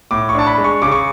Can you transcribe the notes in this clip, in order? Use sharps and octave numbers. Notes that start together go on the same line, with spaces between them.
A2 D6
C#6
D4 A5
B5
G#3
C#6
C#3 D6
C#6